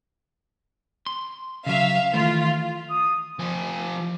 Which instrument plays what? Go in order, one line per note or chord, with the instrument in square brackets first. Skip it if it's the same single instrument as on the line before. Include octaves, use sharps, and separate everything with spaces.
[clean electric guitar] C6
[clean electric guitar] C#3 F#3 [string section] E5 F5
[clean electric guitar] D#3 E3 A3 [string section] F4
[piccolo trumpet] D#6
[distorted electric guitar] F3 G#5